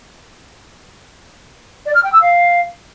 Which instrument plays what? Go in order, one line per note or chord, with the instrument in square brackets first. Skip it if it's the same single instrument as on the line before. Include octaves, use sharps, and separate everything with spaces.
[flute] D5
F6
G5
E6
F5